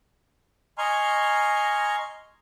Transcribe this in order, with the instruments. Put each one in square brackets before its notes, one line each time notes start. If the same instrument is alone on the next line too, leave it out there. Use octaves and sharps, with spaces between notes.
[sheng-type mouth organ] D#5 G#5 A#5 C6 C#6 F6